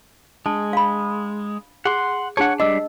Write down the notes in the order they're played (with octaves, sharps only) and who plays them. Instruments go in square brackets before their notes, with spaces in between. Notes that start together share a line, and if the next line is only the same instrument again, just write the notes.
[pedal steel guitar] G#3 [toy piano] D4 A5
[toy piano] F5 B5
[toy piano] G#4 [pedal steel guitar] F#5 C6
[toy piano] D4 G#4 A5 [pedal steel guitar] C#5 F#5
[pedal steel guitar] G3 D4 [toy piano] D#5 E6